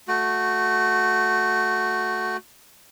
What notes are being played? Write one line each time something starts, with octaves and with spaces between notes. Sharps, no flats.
A3 F#4